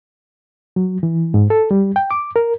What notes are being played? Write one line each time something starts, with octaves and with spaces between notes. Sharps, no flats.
F#3
E3
G#2
A4
G3
G5
D6
A#4